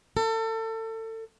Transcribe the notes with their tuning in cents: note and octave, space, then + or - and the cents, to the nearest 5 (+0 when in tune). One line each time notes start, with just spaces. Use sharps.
A4 +30